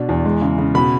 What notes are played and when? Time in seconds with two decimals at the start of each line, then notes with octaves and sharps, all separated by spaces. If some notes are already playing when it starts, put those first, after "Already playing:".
Already playing: B2 D4
0.09 E2
0.25 G#3
0.41 C#3
0.58 C#3
0.75 B2 B5